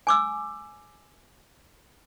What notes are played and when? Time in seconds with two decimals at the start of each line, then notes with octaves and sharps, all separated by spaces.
0.07 G#5 D6 E6